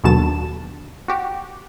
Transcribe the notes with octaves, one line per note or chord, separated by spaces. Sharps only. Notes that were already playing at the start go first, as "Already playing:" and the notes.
D#2 B2 D3 F#3 A5 E7
F#4 G4